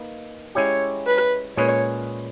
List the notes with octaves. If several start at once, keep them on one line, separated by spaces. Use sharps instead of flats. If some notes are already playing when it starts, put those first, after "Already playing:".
Already playing: A#3 D#4 B4
G#3 C#4 E4 G4 C#5
B4
A#2 G#3 C#4 G#4 B4 C#5